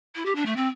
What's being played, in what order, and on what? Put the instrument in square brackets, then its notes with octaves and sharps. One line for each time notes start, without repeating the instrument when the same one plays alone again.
[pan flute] E4
G4
D4
A3
C4